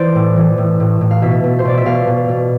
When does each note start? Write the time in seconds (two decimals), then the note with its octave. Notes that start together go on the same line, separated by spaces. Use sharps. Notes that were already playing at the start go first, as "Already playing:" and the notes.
Already playing: E3 C5 D5
0.15 A2
0.36 E3
0.58 A2
0.80 A2
1.01 A2
1.11 F5
1.22 B2 E5
1.44 B2
1.59 C5
1.65 B2 D5
1.77 E5
1.86 B2 F5
2.07 B2
2.29 B2